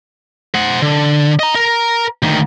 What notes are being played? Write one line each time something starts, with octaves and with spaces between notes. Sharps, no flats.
C5 F#5
D3
D#5 A#5
A#4 A#5
D2 D#3